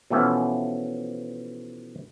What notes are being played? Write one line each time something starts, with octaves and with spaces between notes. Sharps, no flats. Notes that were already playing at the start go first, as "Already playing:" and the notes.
B2 E3 F3 A3 B3 C#4